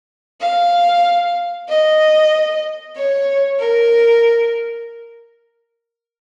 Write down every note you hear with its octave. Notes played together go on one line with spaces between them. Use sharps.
F5
D#5
C#5
A#4